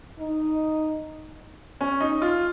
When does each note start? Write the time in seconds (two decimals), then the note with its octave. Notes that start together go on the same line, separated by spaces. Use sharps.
0.20 D#4
1.81 C#4
2.00 D#4
2.22 F4